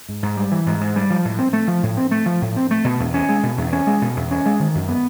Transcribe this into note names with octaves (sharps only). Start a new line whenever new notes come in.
G#2
G#2
G3
E3
G#2
G#2
G3
F3
A2
C4
A3
F3
A2
C4
A3
F3
A2
C4
A3
B2
E2
C#4
G#3
B2
E2
C#4
G#3
B2
E2
C#4
G#3
D#3
F#2
B3